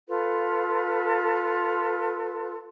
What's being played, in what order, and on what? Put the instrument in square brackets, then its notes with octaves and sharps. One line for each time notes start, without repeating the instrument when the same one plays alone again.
[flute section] F4 A4 B4